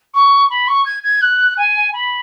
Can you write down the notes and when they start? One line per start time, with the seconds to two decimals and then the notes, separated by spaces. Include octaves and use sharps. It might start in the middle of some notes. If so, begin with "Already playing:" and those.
0.14 C#6
0.50 B5
0.68 C#6
0.86 G#6
1.03 G#6
1.21 F#6
1.57 G#5
1.93 B5